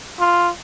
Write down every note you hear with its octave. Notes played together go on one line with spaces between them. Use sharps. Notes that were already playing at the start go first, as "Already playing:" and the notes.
F4